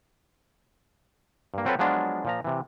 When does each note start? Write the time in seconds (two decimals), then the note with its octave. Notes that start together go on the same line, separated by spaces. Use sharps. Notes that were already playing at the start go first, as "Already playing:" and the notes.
1.54 G2 A#3
1.65 F#3 C4 F4 A4 B4 C#5
1.79 F3 F#3 G#3 B3 D4 F4
2.25 A#2 F3 A#5
2.44 C3 E3